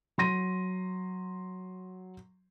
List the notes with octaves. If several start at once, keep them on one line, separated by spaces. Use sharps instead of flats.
F#3 C6 A#6 D#7